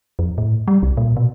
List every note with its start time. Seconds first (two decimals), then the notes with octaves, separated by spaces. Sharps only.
0.19 F2
0.38 A2
0.68 G3
0.83 C2
0.97 A#2
1.17 B2